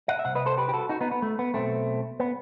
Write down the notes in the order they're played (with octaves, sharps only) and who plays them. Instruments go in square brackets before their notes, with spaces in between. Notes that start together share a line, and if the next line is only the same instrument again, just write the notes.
[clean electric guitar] D#5 F#5
E5
C2 C3 F#5
B4 D#5
A4 C5
G4 B4
G4
F#4 A4
D#4 F#4
B3 D#4
B3
A3
B3
B1 B2 A3 C4
B3